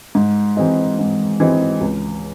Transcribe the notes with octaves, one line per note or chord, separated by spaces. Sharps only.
G#2
E3 G#3 C4 D#4
G#2
E3 G#3 C4 D#4
C#2